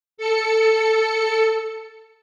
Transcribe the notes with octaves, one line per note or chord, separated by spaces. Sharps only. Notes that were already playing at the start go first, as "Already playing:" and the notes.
A4 C#7